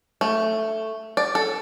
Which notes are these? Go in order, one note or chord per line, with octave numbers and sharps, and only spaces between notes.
A3
D5
A4